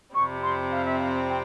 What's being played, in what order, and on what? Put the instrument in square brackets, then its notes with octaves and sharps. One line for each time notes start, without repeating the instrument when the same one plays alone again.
[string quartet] F2 C3 G3 C4 [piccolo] C#6
[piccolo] C6
F5
E5
F5
G5